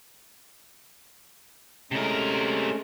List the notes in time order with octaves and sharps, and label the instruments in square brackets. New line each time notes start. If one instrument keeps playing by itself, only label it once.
[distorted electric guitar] C3 A#4 [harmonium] G#3 A3 C#4